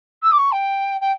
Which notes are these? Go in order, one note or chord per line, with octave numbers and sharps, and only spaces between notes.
E6
D6
C#6
G5
G5